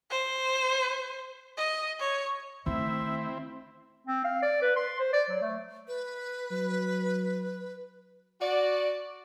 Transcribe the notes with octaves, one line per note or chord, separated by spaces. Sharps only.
C5
D#5
C#5
D#3 A3 C4 E4 E5
C4
F5
D5
B4
C6
C5
D5
F#3
A3
B4
F#3
F#4 D5